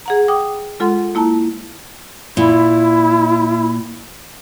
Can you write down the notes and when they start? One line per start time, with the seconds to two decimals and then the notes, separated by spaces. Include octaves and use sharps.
0.06 G#4 F#5 A#5
0.28 G5 D6 D#6
0.80 G#3 F4 A4 F#5 C6
1.15 A#3 E4 A5 A#5
2.37 A#2 E4